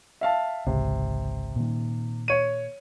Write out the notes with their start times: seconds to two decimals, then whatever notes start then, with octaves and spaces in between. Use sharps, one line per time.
0.21 E5 F5 A5
0.66 G#1 C#2 C3
1.56 A#2 D#3
2.28 C#5 D#7